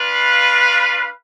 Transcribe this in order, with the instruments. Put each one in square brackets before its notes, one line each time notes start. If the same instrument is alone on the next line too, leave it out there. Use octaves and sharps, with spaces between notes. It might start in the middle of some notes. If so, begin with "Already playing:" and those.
Already playing: [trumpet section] D4 F4 B4 F5